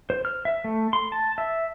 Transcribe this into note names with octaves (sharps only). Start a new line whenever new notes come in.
C5
F6
E5
A3
C6
A5
E5